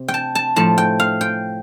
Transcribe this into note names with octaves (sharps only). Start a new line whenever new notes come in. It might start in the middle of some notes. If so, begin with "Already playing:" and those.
Already playing: C3
G5
A5
A5
A2 F3 A3 A5
G5
F5
G5